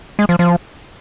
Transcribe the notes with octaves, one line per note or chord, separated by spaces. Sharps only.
G#3
F3
F3